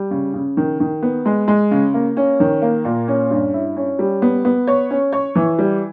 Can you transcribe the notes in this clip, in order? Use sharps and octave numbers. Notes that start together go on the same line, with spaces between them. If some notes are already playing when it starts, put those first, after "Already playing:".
Already playing: G3
C#3
C#3
D#3
D#3
B3
G#3
G#3
C#3
A#3
C#4
D#3
A#3
A#2
C#4
G2
E4
C#4
G3
B3
B3
C#5
C#4
C#5
E3
G3